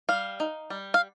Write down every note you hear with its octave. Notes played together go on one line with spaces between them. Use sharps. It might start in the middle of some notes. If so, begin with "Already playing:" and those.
G3 F5
D#4
G3
F5